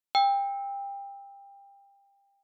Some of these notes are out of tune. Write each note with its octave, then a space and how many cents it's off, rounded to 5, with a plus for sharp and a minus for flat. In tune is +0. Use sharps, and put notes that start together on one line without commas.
G5 +25 E6 -20